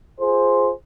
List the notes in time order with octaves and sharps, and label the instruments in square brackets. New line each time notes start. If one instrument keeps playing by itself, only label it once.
[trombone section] F4 G#4 C5